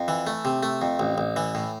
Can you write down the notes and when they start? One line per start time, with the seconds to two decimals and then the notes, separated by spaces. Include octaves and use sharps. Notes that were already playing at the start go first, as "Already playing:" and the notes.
Already playing: F2
0.08 E3
0.27 A3
0.45 C3
0.63 A3
0.82 F2
0.99 A1
1.18 A1
1.36 E3
1.55 A2